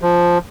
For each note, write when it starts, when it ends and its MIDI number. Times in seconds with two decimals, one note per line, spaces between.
0.02 0.38 53